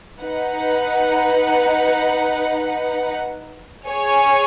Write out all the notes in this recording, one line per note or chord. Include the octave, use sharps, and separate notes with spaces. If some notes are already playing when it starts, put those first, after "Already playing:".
D#4 B4 F#5
G#4 C#5 G#5